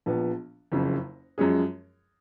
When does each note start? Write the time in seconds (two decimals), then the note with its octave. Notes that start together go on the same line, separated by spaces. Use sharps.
0.06 A#1 A#2 F3 B3
0.72 F#1 F2 C#3
1.38 F#2 F3 G#3 C#4 G#4